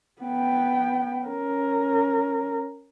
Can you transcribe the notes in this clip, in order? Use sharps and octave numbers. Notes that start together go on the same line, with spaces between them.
B3 G5
C#4 A#4